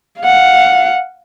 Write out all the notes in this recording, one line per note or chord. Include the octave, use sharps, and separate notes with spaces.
F5 F#5